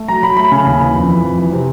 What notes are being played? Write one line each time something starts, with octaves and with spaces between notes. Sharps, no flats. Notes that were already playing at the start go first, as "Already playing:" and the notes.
Already playing: A3
F#3 A#5
F#3 B5
A3 B5
C#3
D#2
E3
F2
E3
F2
E3
C3